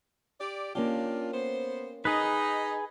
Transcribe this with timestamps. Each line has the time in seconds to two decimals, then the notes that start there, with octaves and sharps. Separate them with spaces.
0.41 G4 D5
0.75 A#3 C#4 D4 F4 G4
1.33 B3 C5
2.05 D#4 G#4 B4